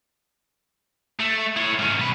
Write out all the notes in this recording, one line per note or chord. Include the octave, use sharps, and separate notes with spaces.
A3
E4 C#5
G#2 C#4
B1 B4